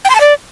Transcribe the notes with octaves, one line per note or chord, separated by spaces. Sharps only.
G5
C6
A5
D5